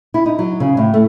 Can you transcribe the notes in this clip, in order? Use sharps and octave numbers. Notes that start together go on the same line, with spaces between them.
E4
D#4
F#3
C#3
A2
A3